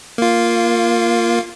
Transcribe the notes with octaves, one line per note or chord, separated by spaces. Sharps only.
A#3 F4